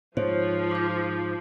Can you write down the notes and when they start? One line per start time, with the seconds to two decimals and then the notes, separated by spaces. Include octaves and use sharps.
0.17 G#2 F3 C5 C#5
0.71 D6 G6